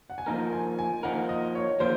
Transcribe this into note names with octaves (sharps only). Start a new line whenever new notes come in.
F#5
G#5
F3 A#3 D#4 A#4 A#5
G#5
G#5
F3 A#3 D#4 A#4 F#5
D#5
C#5
F3 A#3 D#4 A#4 C5